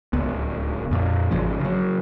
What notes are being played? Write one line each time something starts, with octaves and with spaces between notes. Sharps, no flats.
D1 C#2 B3
F2 A#2
G#1 C#3 F3
C#3 F#3